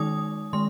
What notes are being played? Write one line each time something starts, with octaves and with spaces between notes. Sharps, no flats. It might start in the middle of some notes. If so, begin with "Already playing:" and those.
Already playing: D#3 G#3 D#4 D#6
D#3 G#3 C6